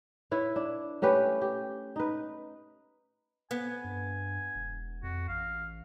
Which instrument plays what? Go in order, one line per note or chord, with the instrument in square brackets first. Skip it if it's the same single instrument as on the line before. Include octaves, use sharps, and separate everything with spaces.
[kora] E4 B4 C#5
D4
A3 C#4 G4 B4
G4
D#4 B4
[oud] B3 [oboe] G#5
[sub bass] G2
E1
[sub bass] F2 [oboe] F#4
[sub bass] A1 [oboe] F5